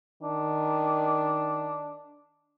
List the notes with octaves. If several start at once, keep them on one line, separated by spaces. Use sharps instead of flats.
D#3 D4